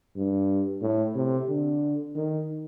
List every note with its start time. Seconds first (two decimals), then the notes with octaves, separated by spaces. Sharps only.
0.16 G2
0.82 A2
1.15 C3
1.49 D3
2.15 D#3